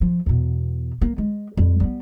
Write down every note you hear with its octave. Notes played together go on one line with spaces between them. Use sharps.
F3
E2 B2
A#3
G#3
F2 G3
G3 B3